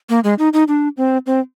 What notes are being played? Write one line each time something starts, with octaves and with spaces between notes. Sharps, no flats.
A#3
G#3
D#4
D#4
D4
C4
C4